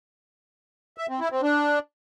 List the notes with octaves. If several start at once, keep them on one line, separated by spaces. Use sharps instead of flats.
E5
C4
E4
C4
D4